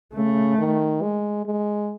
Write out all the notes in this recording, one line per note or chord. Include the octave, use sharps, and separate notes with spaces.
C#3 A3
D#3
G#3
G#3